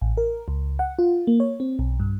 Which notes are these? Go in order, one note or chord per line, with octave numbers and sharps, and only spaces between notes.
A1
A#4
C#2
F#5
F4
A#3
C#5
C4
B1
G2